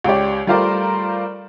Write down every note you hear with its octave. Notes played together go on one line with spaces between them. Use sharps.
C#2 G4 C#5 D5
G3 A3 F4 A#4 C5 D5